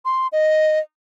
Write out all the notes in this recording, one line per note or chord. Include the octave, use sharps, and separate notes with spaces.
C6
D#5